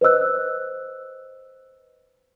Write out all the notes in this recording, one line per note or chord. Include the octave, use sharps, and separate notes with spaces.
B4 C5 D#5 E6 F#6